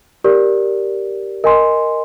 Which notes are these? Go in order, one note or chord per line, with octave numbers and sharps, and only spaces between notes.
G4 A#4 D5
A#4 D#5 G#5 C6